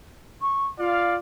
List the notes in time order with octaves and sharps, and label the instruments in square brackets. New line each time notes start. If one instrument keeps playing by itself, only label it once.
[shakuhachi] C#6
[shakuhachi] F4 [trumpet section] D5 F5